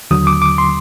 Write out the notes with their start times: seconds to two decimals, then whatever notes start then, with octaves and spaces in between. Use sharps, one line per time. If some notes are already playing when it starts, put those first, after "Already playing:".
0.11 D#2 D3 F#3 D#6
0.27 D6
0.42 D6
0.58 C6